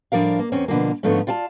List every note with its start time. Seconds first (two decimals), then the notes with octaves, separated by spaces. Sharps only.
0.12 A2 F3 D4 A#4 F5
0.39 A#3
0.52 E2 C4 C#4
0.68 B2 D3 F3 A#3
1.03 G#2 D3 F3 A3 B3 C#4
1.27 F4 D5 F5 G5 A5